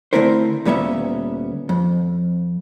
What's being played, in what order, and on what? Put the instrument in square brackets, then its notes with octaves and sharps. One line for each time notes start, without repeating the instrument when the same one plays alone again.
[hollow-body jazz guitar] D3 A3 C4 E4 A#4 C5
D2 A#2 G3 B3 C#4 E5
F2